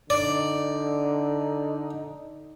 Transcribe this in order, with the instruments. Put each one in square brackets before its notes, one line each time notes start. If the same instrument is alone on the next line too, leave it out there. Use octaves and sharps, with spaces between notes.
[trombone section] D3 D#4 [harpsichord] D5